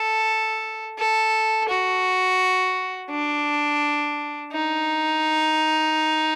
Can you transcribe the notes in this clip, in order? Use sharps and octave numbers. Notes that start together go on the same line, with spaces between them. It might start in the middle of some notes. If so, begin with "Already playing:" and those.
Already playing: A4
A4
F#4
D4
D#4